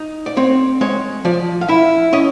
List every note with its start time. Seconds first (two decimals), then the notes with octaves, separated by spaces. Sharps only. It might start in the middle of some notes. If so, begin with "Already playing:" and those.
Already playing: D#4
0.26 D5
0.37 C4 C#5
0.81 G#3 C#5
1.25 F3 D5
1.61 F5
1.69 E4 E5
2.13 C#4 D#5